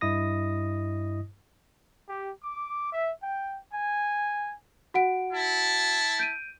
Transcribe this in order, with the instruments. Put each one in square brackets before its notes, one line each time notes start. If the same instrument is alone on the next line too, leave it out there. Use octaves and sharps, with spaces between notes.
[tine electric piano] G2 E4 D#5 D#6 A#6
[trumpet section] G4
D6
E5
G5
G#5
[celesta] F#4 F#5 D7
[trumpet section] E4 A5
[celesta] G6 D7 D#7